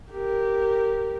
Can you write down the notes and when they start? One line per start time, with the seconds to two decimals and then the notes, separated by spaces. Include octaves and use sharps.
0.12 G4 A#4